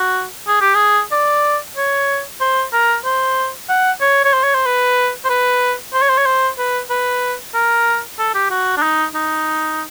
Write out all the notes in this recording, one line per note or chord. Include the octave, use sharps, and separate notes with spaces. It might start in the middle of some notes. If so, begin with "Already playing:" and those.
Already playing: F#4
G#4
G4
G#4
D5
C#5
C5
A#4
C5
F#5
C#5
C#5
C5
C#5
C5
B4
C5
B4
C5
C#5
C5
C#5
C5
B4
B4
A#4
A4
G4
F#4
D4
D#4
D#4